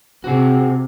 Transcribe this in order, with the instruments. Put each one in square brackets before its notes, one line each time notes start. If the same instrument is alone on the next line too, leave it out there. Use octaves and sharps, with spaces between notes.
[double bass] C3 [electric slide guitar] F#4 G#4